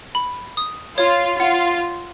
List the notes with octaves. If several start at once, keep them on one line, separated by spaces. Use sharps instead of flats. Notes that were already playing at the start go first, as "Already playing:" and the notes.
B5
D#6
F4 C#5
F4 F#5